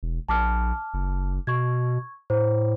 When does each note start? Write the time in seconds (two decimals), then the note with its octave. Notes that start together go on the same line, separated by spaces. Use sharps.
0.03 E1
0.29 A#1 A5 D6 F6
0.94 F#1
1.47 B2 C#6 G#6
2.30 A2 C5